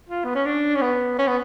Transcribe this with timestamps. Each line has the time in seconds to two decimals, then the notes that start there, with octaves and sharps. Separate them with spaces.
0.09 F4
0.25 B3
0.35 C#4
0.46 D4
0.75 C#4
0.82 B3
1.18 C#4
1.28 B3